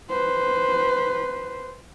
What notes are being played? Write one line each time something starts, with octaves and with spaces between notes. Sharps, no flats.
B4 C5